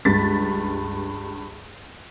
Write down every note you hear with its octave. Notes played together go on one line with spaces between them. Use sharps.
C#2 G2 A6 B6